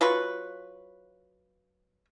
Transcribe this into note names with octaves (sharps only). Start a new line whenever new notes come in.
F#3 F4 B4 C#6